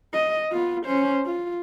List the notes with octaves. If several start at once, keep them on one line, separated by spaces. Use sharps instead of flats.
D#5
B3 F4
C#4 C5
F4